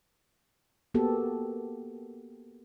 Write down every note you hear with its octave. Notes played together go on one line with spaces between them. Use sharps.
A#3 B3 F#4 G4 A4